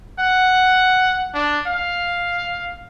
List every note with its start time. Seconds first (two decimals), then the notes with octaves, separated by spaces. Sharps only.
0.19 F#5
1.34 D4
1.67 F5